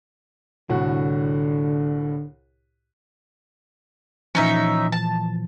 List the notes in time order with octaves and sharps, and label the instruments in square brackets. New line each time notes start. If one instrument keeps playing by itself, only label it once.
[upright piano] C2 A2 F#4 [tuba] D3
[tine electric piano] A#2 E3 F3 [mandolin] C#4 D#4 E5
[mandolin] A5